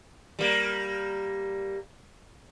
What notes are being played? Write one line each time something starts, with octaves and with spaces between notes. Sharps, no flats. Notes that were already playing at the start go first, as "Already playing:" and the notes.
G3 A#3